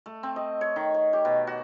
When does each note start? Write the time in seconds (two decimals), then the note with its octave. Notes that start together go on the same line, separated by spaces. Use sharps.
0.06 A3
0.23 C4
0.36 D#5
0.61 C#5
0.76 D#3
0.94 C#5
1.13 G4
1.25 B2
1.47 F#4